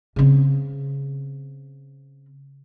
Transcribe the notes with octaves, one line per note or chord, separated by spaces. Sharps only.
C#3 C4